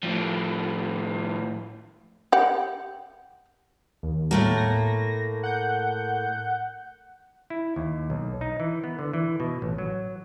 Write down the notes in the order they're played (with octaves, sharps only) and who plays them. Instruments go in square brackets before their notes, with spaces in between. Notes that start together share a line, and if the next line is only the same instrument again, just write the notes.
[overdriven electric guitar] A2 F3
[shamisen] G4 F#5
[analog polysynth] D#2
[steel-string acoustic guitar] A2 A3 A#3
[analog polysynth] A#6
F#5 G6
[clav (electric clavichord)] E4
D#2
B1
D#4
E3
B3
D3
E3
B2
A1
F#3